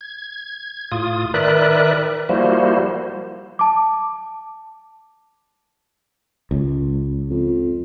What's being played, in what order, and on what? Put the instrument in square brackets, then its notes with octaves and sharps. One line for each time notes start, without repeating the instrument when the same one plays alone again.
[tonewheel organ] G#6
A2 F4 D#6
D#3 A#4 B4 D5 E5 F#6
F3 G3 A#3 E4 F#4 C5
[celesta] A5 D6
[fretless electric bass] C#2
[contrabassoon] F2